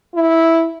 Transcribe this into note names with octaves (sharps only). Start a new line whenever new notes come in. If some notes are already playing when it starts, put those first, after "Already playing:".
E4